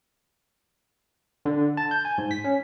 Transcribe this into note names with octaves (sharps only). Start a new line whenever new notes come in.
D3
A5
G6
G#5
G#2
B6
C#4